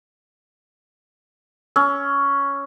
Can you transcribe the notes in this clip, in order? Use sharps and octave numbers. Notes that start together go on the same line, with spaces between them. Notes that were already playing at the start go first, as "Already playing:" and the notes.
C#4 E6